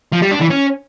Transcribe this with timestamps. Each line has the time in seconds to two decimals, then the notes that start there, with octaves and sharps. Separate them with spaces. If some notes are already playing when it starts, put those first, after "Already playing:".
0.13 F3
0.22 G3
0.32 D4
0.41 E3
0.50 C#4